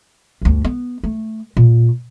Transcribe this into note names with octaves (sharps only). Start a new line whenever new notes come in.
G1 D2
B3
A3
A#2